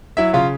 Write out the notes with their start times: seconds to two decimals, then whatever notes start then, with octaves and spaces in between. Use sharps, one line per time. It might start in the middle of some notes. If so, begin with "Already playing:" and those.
0.17 F#3 E4 E5
0.33 C#3 F4 F5